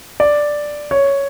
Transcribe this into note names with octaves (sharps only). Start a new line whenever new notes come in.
D5
C#5